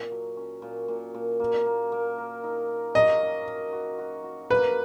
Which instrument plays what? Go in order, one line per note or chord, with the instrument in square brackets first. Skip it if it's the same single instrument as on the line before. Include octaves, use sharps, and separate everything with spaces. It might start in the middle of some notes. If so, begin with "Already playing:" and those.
Already playing: [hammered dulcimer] A#2
F#3
C#4
A#2
A#2
A#2
A#3
A#3
A#3
A#4
D#4
A#4
[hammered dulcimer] F#3 [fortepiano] D#5
[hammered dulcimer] C#4
A#4
F#4
F#4
F#4
[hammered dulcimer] A#3 [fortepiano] B4